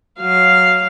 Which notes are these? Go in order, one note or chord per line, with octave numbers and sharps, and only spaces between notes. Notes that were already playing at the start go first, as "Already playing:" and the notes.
F#3 F5